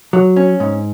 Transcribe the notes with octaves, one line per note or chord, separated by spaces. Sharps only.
F#3
C#4
G#2